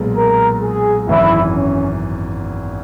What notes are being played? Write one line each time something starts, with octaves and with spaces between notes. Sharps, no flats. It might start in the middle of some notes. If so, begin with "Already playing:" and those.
Already playing: B1 A#2 G#3 B3
A#4
G#4
G#1 F#2 E3 E4
C#4